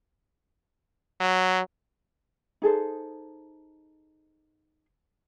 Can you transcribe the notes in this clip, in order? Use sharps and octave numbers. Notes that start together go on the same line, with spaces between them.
F#3
D#4 G#4 A4 C5